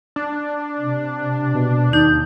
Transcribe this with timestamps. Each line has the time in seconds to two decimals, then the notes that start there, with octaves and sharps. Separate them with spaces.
0.16 D4
0.80 C3
1.54 B2
1.93 D#2 D#4 G6